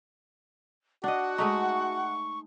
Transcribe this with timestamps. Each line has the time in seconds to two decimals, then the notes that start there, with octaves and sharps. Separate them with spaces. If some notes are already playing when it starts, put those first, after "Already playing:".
1.04 D4 F#4 D#5 F#5
1.38 G#3 A3 D#4 C#6